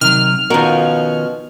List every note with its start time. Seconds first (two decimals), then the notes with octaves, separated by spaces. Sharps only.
0.01 C3 D#3 F#3 F6
0.50 B2 D#3 F3 C#4 F#4 A#4